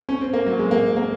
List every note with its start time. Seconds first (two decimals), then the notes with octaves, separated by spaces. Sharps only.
0.09 C#4
0.21 C4
0.33 A#3
0.46 F#3
0.59 G#3
0.71 A#3
0.97 A#3